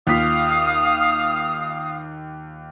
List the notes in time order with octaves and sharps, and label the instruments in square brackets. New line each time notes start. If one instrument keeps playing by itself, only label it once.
[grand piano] D#2 F4 B6 [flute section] F5 D#6